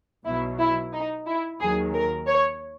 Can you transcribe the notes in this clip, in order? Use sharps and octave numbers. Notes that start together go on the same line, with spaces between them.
B1 B2 F#3 E4
E4
D#4
E4
D#2 D#3 F#3 G#4
A#4
C#5